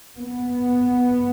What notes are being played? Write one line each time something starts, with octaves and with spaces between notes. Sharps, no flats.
B3